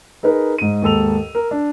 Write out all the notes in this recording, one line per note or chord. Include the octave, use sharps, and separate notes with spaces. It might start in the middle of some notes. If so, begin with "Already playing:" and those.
D#4 G#4 A#4 B4
G#2 D#7
D#2 G#2 A4 E6 F7
A#4
D4